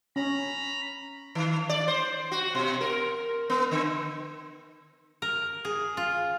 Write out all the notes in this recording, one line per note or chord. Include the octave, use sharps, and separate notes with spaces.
C#4 A#5 B5
D#3
D5
C5
F#4
B2
A#4
B3
D3
A#4
G#4
F4